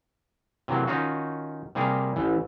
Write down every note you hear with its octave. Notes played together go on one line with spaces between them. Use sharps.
C3 E3 F#3 A3 A#3
D#3 C#4 D#4 F4 F#4
C3 G3 A#3 G#4 A#4
A1 E3